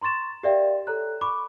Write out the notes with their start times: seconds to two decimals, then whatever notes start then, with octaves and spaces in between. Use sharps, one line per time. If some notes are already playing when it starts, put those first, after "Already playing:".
0.01 A#5 C6 C#6 A6 E7
0.43 G4 A#4 D5 E5 F5 G5
0.87 A4 C#5 A#5 F#6
1.21 B5 C#6 D6